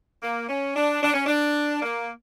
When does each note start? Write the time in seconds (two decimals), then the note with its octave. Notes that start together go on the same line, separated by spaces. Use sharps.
0.22 A#3
0.48 C#4
0.75 D4
1.03 D4
1.14 C#4
1.27 D4
1.82 A#3